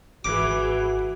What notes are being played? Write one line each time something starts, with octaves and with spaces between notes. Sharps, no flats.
G#1 E3 F#4 G#4 D6